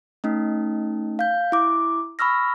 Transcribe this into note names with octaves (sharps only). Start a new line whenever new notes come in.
A3 C#4 D#4
F5 G6
E4 D6
B5 C#6 E6 F6 A#6